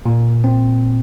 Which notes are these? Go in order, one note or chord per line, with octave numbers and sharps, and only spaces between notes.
A#2
C4